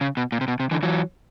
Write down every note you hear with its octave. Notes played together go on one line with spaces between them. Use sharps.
C#3
B2
A#2
C3
B2
C3
D3 E3
E3 F#3